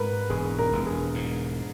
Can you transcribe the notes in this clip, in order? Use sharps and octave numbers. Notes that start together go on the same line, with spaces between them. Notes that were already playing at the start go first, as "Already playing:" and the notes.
Already playing: G#2 A#4 B4
E1 G#4
A#4
E1
G#4
G#2